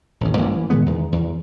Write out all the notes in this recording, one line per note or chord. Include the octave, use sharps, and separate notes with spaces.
A1 D#2
A1 G2 A#3
E3
A#2 D#3 G#3 B3
E2 D#3
E2